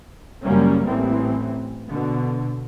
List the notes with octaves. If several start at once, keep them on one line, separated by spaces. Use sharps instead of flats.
F#2 C#3 G3 A#3 C#4
A1 E3 C4
B2 D3